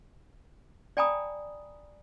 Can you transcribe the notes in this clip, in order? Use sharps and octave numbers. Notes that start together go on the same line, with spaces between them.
D5 G5 G#5 A#5 B5 D#6